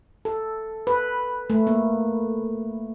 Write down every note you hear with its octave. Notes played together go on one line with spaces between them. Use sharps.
A4
B4
A3
A#3